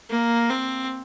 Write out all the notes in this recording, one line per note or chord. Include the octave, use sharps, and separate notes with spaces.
A#3
C4